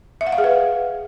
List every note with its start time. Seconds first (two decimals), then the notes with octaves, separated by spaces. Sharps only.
0.21 E5
0.27 F#5
0.32 F5
0.38 G#4
0.44 B4